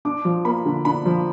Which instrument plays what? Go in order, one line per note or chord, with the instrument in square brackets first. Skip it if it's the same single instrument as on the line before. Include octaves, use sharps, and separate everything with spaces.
[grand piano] D4 D6
F3
A#3 B5
D3
D4 B5
F3